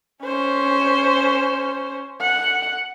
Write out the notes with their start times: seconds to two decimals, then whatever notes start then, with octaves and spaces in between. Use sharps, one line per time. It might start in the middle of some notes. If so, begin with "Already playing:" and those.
0.25 C#4 C5
2.22 F#5